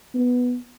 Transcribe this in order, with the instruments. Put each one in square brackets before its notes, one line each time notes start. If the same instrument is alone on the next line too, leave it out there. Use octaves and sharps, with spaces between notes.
[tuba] B3